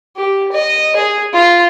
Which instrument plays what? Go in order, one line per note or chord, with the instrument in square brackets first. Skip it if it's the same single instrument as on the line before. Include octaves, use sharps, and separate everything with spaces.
[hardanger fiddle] G4
D#5
G#4
F4